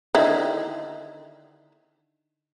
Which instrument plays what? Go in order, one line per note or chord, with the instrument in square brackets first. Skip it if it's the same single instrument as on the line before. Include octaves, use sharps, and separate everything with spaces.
[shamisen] D3 D#3 E4